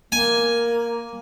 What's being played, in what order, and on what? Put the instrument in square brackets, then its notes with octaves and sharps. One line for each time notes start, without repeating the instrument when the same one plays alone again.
[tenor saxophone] A#3 [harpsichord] G#5